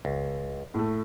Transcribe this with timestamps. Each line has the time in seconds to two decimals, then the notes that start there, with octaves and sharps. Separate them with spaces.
0.05 C#2
0.74 A2 A3